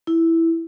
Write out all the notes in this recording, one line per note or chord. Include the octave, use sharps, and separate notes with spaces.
E4